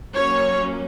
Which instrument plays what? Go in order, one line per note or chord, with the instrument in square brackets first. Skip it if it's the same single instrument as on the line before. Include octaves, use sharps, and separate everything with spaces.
[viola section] F#3 A#3 C#4 C#5